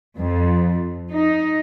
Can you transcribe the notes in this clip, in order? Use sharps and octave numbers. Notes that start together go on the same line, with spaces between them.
F2
D#4